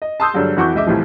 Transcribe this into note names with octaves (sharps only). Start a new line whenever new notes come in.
D#5
A5 C6 D#6 E6 G6
G2 D3 F#3 G#3
F2 E3 F#4 C#6 D6 G6
C#2 D#5 E5 D6
C2 A2 E3 F3